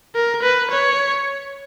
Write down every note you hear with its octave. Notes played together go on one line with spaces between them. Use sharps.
A#4
B4
C#5